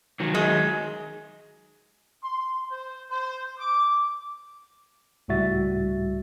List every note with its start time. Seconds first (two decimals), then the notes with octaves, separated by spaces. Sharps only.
0.20 D#3 F#3
0.35 G#3
2.22 C6
2.70 C5
3.10 C5
3.59 D6
5.28 C#2 A2 G3 F#4 E5 A6